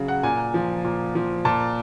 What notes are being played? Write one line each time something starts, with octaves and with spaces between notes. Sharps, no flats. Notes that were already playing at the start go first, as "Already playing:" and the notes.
Already playing: C#3 F#3
F#5
A#2 G#5
F3
A#2
F3
A#2 A5